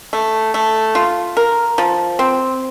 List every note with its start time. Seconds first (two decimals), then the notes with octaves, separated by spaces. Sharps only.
0.13 A3
0.54 A3
0.95 F4
1.37 A#4
1.78 F3
2.19 C4